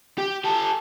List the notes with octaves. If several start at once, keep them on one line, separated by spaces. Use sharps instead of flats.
G4
G4 A4